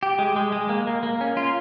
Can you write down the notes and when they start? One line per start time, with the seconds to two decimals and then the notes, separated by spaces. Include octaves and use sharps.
0.03 G4
0.19 G#3
0.36 G#3
0.52 G#3
0.69 A#3
0.87 A#3
1.03 A#3
1.21 C#4
1.37 F4